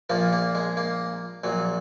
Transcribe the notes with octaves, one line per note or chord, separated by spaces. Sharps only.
A#1 A#2 F3 A#3
A#3
G#3
A#3
A#1 A#2 F#3